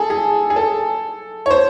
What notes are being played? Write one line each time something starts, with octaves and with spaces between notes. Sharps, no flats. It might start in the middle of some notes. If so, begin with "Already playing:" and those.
Already playing: G#4 A4
G#4
G#4
A4
C#5
C5